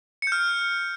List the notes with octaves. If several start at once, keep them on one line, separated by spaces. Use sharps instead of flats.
F6 G6 C#7